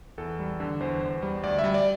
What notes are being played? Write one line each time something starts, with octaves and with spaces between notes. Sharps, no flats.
E2 A4
G3
D3
E2 C5
E2
G3
D2 D5
E5
G3
D5